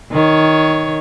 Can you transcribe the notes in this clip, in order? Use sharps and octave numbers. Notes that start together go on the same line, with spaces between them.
D#3 C#5